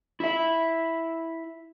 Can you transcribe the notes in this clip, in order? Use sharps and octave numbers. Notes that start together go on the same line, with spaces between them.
E4 E5